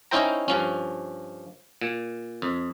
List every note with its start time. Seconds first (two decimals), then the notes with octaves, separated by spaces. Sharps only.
0.11 C#4 D#4 E4 C5 G5 A#5
0.48 G2 F3 C#4
1.81 A#2
2.42 F2